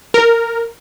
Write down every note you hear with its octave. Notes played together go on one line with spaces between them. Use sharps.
A#4